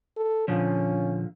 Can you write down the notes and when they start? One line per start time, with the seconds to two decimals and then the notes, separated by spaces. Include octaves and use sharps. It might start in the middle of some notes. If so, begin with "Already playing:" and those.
0.17 A4
0.48 A#2 D3 F3 C#4